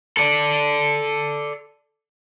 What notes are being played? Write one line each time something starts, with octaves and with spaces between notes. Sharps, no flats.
A4 D5